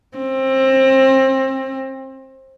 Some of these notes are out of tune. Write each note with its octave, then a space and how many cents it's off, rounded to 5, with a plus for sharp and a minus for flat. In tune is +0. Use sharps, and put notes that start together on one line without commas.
C4 +25